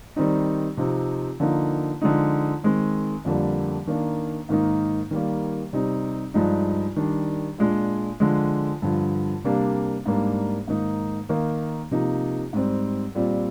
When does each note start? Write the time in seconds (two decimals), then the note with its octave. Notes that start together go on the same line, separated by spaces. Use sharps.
0.16 D#3 G3 C4 D#4
0.77 C3 F3 C4 D#4
1.40 D3 F3 A#3 D#4
2.01 D3 F3 G#3 D#4
2.63 D#3 G#3 C4
3.25 F2 D3 G3 A#3
3.87 D#3 A#3 D4
4.49 G#2 D#3 A#3 D#4
5.11 D#3 G3 A#3
5.73 C3 G3 C4 D#4
6.34 G2 F3 G#3 D#4
6.96 D#3 G3 D4
7.58 A#2 G#3 D4
8.20 D3 F3 G#3
8.82 G2 D3 F3
9.44 C3 G3 A#3 D4
10.05 G#2 G3 A#3 D4
10.67 G#2 D#3 A#3 D#4
11.29 D#3 A#3 D#4
11.91 C3 F3 A#3 D#4
12.53 G#2 G3 C4
13.15 A#2 G3 C4